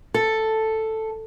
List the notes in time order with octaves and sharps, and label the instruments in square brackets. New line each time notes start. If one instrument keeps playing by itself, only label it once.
[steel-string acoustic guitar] A4